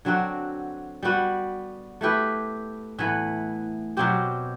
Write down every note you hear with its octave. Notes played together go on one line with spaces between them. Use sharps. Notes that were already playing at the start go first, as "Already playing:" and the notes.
D3 F#3 C4 F#4
G3 B3 F#4
A3 E4 G4 B4
A2 E3 B3
B2 F#3 C4 G4